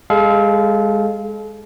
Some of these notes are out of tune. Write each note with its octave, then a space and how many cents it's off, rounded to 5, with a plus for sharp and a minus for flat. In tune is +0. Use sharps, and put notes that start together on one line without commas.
G#3 -20 A4 -40 F5 -10